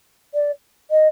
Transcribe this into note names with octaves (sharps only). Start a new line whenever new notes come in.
D5
D#5